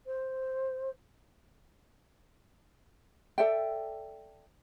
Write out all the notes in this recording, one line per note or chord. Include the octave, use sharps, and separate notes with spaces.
C5
A4 D5 E5 G5